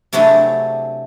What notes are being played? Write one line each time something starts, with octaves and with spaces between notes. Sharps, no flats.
C3 F#3 A3 D4 E4 G#4